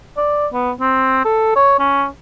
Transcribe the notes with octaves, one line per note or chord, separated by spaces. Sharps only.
D5
B3
C4
A4
C#5
C#4